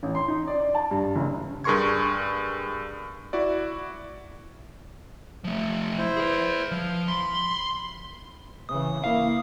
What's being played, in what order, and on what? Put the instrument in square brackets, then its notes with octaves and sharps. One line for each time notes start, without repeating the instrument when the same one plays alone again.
[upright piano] A1
C6
D#4
D5
D5
A5
G2
F#1
[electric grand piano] G2 G#4 A#4 C6 C#6 G#6
E4 F#4 D5
[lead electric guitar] F3 A3
[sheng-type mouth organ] E4 C5
[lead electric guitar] G#4 B4
[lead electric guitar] F3 [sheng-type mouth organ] F5
[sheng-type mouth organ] B5 [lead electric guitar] C6
[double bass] C#3 E3 [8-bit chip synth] D#6
[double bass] A#3 E4 [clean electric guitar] F5